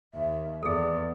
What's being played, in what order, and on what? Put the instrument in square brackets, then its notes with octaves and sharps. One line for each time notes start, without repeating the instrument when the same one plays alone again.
[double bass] D#2 [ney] E5
[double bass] E2 [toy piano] G#4 A4 [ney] D5